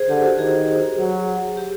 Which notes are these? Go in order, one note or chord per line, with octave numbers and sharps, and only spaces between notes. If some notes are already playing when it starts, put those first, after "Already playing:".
Already playing: G#4 C5
D3 G4
F#4
D#3 G#4
F#3
G4